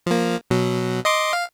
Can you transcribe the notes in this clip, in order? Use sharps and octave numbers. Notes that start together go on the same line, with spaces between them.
F3 A#3
B2 F#3
D#5 C6 D6
F5